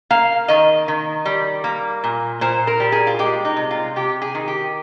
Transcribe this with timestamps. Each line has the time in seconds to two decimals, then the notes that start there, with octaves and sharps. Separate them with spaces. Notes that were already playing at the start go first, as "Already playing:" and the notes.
0.10 A#3 F5
0.48 D#3 D#5
0.88 D#3
1.25 G3
1.64 A#3
2.04 A#2
2.41 A#2 C5
2.67 A#4
2.80 G3
2.92 G#4
3.07 F4
3.19 G#3 G4
3.45 D#4
3.57 C3
3.71 F4
3.96 C3 G4
4.22 G#4
4.35 D#3
4.48 G4